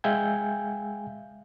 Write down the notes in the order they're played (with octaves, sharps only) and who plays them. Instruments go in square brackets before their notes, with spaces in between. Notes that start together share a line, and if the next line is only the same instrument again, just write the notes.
[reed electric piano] G#3 E5 F5 G5 G#5 G6